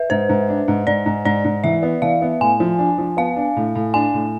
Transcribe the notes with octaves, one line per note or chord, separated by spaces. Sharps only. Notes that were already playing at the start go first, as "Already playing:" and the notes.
Already playing: B4 E5
G#2 C5
G#2
D4
G#2
G#2 D5
G#2
G#2 D5
G#2
E3 E5
B3
E3 F5
B3
A2 G#5
F3
D4
F3
B3 F5
D4
A2
A2
D4 G#5
A2